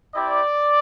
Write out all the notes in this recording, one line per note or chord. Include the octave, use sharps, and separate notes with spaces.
C4 E4 G4 D5